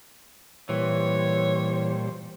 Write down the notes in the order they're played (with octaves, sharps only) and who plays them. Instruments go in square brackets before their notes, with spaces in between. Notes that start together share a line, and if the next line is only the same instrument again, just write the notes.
[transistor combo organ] A#2 G3 C5 [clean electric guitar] E3 [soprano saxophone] C#5